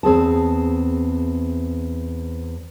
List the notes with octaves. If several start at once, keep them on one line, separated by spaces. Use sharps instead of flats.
E2 C4 G#4 A5